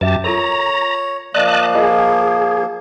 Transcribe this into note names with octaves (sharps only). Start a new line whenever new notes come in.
F#2 G4 B4 E5 A5
F4 A4 A#4 C#5 A#5
F3 A#3 D5 D#5 A5 F#6
F4 G#4 A#4 D#5